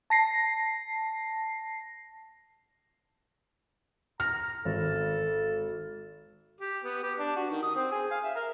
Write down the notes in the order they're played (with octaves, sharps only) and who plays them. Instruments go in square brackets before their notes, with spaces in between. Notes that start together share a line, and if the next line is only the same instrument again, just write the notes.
[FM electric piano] A5 A#6 C7
[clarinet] A#5 [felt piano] F6
[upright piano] G#1 [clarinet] A4
[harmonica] G4
B3
G4
D4
F#4
D#3
D#6
C4
G#4
F5
E5
A#4